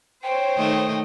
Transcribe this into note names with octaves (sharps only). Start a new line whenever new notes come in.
C5 C#5 G5
D#3 A3 D#5